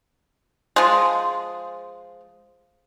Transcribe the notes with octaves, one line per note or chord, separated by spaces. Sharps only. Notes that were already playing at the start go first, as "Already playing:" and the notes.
F3 G#3